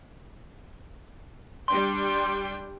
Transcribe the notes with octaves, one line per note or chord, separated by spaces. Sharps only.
G3 D4 G5 C6